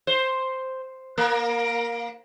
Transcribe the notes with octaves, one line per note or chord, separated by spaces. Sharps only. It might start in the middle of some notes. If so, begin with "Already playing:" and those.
C5
A#3 A#4